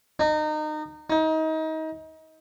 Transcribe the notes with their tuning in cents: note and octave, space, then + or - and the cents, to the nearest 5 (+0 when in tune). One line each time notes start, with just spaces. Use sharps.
D#4 -25
D#4 +30